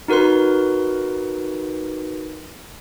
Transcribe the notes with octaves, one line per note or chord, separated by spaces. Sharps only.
D#4 F#4 A#4 B4 C6